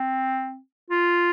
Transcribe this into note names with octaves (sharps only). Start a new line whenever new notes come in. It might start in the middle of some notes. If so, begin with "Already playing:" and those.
Already playing: C4
F4